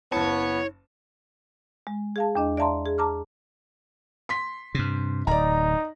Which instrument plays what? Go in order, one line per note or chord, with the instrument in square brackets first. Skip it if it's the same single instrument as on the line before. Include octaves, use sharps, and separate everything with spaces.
[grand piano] F#1 A5 [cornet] B3 [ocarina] E4 [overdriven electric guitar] C#5
[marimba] G#3
G#4 F5 A5
E2 D4 D#5
D5 E5 F5 A5 A#5 C6
G#4
A5 A#5 D6 F6
[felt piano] C6 B6
[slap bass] G2 C3
[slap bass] D1 [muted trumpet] D#4 [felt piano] D5 A#5